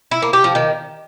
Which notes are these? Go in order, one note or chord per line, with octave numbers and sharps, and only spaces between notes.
E4
A#3
G4
F3
D#3